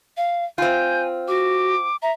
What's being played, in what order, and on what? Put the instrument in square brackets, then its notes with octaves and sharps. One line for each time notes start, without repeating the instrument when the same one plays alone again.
[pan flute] F5
[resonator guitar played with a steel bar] C4 F4 [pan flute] G#5 [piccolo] G6
[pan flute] F#4 [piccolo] D6
[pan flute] E5 [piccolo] A#5